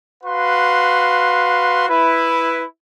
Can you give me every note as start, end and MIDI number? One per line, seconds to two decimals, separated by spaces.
0.24 1.85 66
0.24 1.85 71
0.24 1.85 77
0.24 1.85 84
1.89 2.64 64
1.89 2.64 71